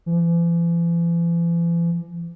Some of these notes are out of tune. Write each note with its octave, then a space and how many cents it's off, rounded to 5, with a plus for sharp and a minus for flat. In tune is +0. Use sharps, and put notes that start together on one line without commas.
E3 +45